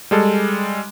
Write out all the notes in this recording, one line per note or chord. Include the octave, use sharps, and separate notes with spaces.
G3 G#3 A4